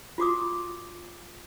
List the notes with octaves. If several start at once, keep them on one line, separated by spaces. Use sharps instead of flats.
F4 F#4 D6 D#6